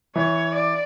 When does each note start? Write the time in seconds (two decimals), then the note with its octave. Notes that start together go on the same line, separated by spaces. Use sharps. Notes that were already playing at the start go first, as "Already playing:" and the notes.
0.16 E3 C#5
0.55 D5